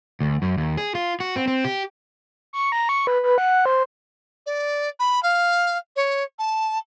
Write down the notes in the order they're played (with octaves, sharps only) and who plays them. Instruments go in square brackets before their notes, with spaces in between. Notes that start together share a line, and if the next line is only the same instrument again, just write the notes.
[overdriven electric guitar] D2
F#2
D#2
G#4
F4
F#4
C4
C4
G4
[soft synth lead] C#6
A#5
C#6
B4
B4
F#5
C5
[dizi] D5
B5
F5
C#5
A5